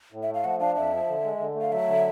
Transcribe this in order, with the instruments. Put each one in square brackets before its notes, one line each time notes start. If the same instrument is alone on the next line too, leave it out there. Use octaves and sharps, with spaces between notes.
[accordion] A2
[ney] E5
[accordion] A3
[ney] F5
[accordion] F3 [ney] F#5
[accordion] D4 [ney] F5
[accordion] F2 [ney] E5
[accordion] F3
D3
G#3
D3
A3
[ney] F5
[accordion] F#3 [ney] E5
[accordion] D3